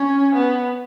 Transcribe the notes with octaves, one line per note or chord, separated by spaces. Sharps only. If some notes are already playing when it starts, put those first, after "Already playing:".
Already playing: C#4
B3